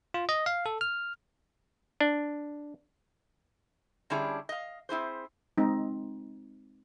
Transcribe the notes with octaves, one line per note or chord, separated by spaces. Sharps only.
F4
D#5
F5
A4
F6
D4
D3 G3 C#4 D4 E4 G#4
D#5 F5
C4 E4 G#4 C5
G#3 C4 D#4